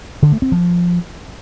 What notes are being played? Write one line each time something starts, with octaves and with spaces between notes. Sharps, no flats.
D3
A3
C4
F3